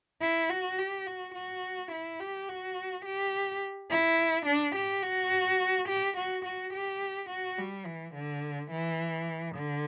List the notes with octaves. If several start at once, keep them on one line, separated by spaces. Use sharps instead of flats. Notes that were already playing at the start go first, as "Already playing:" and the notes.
E4
F#4
G4
F#4
F#4
E4
G4
F#4
G4
E4
D4
G4
F#4
G4
F#4
F#4
G4
F#4
G3
E3
D3
E3
D3